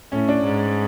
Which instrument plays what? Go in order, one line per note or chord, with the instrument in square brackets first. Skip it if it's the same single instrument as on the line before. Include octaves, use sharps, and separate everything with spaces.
[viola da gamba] A2 [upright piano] C#4
[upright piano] D4
[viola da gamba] G#2